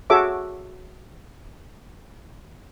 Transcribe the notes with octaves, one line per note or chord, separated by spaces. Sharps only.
F#4 G#4 A4 C#5 E5 D6